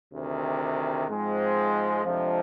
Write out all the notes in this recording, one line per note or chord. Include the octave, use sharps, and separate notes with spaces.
D2 C3 D#3
G#2 F3 G#3 C4
F2 C3 F3 G#3 D4